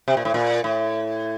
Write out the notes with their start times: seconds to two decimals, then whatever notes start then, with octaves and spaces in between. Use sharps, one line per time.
0.08 C3
0.17 A#2
0.25 A2
0.34 A#2
0.64 A2